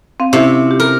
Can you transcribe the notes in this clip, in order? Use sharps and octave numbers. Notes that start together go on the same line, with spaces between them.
C4 F5
C3 C#4 E4
F4 G4
A#4